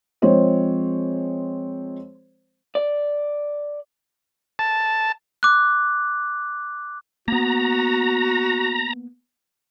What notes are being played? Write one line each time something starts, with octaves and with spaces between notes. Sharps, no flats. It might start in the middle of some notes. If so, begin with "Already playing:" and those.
F3 G#3 C4 G#4 C5 C#5
D5
A5
D6 F#6
A#3 B3 F#4 A#5